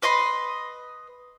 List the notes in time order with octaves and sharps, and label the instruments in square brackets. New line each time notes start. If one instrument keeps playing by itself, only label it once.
[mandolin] B4 D#5 B5 C6